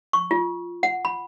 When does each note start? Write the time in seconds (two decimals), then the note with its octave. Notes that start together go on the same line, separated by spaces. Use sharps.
0.13 C#6
0.31 F4
0.83 F#5
1.05 B5